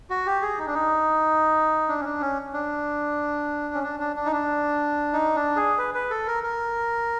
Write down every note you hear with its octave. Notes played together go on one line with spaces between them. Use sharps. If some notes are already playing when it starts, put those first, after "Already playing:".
F#4
G4
G#4
D#4
D4
D#4
D4
C#4
D4
C#4
D4
C#4
D4
D4
D4
D#4
D4
D#4
D4
G#4
B4
B4
A4
A#4
A#4